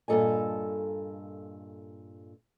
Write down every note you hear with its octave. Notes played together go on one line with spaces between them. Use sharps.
G2 A#2 F3 A4 D#5 G#5